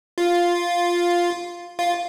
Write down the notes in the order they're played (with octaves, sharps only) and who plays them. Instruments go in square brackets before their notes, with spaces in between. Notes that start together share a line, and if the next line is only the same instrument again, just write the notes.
[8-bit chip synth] F4
F4